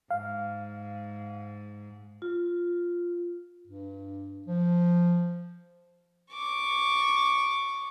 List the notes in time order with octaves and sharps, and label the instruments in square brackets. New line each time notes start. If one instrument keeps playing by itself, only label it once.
[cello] G#2 [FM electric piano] F5
[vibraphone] F4
[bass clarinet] G2
F3
[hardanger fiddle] C#6 D6